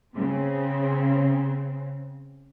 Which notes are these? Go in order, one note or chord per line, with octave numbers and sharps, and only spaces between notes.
C#3 C4